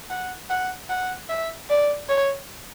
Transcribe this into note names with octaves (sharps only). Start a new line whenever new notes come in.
F#5
F#5
F#5
E5
D5
C#5